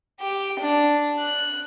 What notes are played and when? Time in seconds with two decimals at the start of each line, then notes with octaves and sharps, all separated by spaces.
0.21 G4
0.59 D4
1.19 F#6